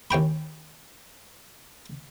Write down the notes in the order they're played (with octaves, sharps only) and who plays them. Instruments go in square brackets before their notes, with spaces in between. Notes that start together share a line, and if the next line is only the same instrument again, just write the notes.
[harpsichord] D#2 C#4 G5 B5